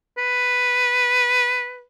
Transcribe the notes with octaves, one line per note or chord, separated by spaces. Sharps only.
B4